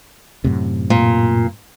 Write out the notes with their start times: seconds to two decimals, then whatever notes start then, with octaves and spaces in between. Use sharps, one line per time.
0.44 F#2 A2 C3
0.90 A#2